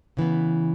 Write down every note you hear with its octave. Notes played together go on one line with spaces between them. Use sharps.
C#3 E3 B3